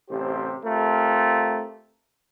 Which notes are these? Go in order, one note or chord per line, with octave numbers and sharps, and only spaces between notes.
A1 C3 G4 C5
A3 C4 F4 G4 A#4